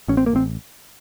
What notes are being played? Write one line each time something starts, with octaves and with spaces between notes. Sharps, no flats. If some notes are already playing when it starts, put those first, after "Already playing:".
A1 C#4
C4
A#3
A1 C4